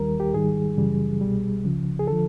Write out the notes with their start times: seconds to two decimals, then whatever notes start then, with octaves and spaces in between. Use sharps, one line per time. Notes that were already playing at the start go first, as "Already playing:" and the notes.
Already playing: D#2 D#3 G3 A#4
0.20 G4
0.34 G#2 D#3 G3 G#4
0.77 F#2 C#3 E3 G3
1.21 C2 B2 G3
1.65 C#2 C#3 F3
1.99 G#4
2.07 D3 F3 A4